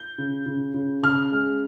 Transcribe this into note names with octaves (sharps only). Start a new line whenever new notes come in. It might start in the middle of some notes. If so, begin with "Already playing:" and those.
Already playing: G6
C#3
C#3
C#3
C#3 F6
G#3